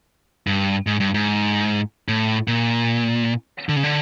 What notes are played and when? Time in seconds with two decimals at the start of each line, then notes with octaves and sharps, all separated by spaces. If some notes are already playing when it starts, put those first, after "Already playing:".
0.47 G2
0.87 G#2
1.00 G2
1.14 G#2
2.08 A2
2.48 A#2
3.69 D3
3.76 C#3
3.84 D3